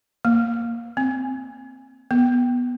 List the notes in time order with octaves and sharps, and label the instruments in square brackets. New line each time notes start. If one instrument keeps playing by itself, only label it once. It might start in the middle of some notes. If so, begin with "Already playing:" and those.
[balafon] A#3
C4
B3